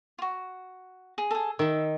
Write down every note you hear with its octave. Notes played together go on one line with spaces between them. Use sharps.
F4 F#4
G#4
G#4 A4
D#3 E5 B5